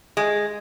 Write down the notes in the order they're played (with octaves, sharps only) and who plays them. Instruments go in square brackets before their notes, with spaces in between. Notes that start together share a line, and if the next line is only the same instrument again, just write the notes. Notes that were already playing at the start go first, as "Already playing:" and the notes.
[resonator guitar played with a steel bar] G#3